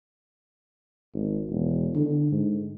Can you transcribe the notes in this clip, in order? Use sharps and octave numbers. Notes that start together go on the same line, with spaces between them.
G#1
E1
D3
G#2